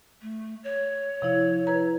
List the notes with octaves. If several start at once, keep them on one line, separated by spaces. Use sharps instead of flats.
A3
C#5
C3 F3 E4
E4 B4 A#5